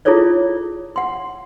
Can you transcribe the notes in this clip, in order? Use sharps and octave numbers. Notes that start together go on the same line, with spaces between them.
E4 F4 G#4 A4 C#5 D5
F#5 C6